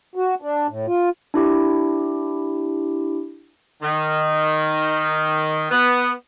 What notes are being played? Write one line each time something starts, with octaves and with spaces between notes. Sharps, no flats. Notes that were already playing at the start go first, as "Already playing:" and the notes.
F#4
D4
A2
F4
D4 E4 G4
D#3
B3